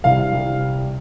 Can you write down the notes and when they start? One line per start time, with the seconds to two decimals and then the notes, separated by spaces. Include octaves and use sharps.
0.04 C2 F5
0.33 C2